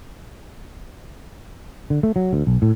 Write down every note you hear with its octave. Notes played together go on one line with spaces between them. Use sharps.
D3
A3
F#3
D2
B1
A2